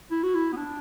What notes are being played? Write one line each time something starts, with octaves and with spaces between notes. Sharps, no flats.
E4
F#4
E4
B3
D4